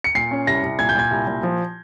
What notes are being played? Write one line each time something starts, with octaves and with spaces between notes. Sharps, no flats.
C#7
A#2 C7
C#4
C2 A#6
C2
A#2 G#6
G6
A#2 G#6
C2
A#2
F3